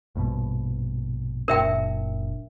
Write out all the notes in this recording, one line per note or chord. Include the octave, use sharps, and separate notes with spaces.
A#1 G2 B2
F#1 A#2 D4 A#4 E5 G5